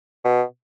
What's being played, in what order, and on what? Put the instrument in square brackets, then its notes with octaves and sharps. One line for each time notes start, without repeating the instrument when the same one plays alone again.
[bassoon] B2